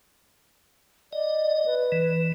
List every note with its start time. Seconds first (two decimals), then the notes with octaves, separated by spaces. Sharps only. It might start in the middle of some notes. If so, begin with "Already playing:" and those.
1.13 D5 D#5
1.66 B4
1.92 E3